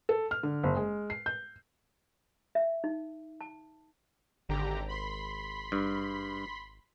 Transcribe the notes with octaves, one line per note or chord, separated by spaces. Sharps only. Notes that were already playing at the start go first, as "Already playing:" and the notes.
A4
F6
D3
F#1
G#3
C7
G6
E5
D#4
A5
G#1 D3 G4 A#5
B5 C6 B6
G2